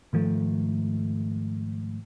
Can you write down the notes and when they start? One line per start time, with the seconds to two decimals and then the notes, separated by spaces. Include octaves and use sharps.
0.13 G#2 D#3 F3 A3